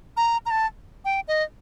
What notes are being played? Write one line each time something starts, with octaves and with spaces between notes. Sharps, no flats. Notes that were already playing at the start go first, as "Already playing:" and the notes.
A#5
A#5
A5
G5
D#5